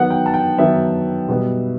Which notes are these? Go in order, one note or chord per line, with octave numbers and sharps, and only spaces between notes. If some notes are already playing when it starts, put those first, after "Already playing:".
Already playing: D#3 F#3 B3 F#5
G5
A5
G5
D#3 F#3 B3 E5
B2 G3 B3